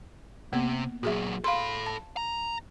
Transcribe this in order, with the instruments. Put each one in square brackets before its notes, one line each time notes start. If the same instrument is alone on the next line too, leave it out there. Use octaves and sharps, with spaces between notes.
[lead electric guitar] C3 [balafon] A#3 B3
[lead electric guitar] A#2 F#3 [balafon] F#4 G#4 E5
[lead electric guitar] A4 B5 [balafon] F5 C6
[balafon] A5
[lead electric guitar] A#5